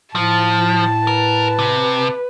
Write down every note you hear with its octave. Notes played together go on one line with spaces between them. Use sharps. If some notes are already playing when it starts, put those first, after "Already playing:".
A2 F3 A5
A#4 B4
C3